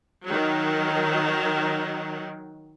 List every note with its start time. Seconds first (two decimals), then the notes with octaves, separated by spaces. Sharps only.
0.24 D#3 F#3